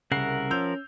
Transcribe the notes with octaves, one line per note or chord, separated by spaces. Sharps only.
C2 C#3 A#4 E5 F#5 C7
F3 C#4 E6 G6 F7